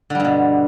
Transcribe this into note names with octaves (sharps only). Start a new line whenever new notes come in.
G2 B2 D3 G3